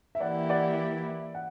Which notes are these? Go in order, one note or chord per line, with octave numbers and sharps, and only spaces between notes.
E5
E3 A#3 E4 G4 D5 F#5
D5 F#5
F#5